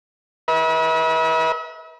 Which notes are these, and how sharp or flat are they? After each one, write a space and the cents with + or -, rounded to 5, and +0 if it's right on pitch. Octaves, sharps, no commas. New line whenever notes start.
B4 -35 E5 -45